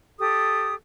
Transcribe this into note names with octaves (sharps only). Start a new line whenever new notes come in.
G4 A4 D#6